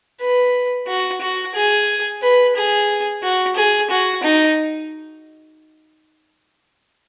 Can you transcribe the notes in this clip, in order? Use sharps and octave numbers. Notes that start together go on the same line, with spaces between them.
B4
F#4
F#4
G#4
B4
G#4
F#4
G#4
F#4
D#4